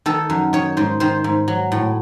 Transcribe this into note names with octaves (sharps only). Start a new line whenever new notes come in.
D#3 A4
F#2
D#3 C#5
G#2 C5
D#3 C5
G#2
F#3
A2